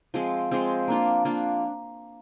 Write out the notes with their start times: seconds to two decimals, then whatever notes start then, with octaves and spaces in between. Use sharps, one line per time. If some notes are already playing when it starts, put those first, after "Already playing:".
0.14 F3 G#3 C4
0.51 F3 G#3 C4
0.88 A#3 D4 F4
1.25 A#3 D4 F4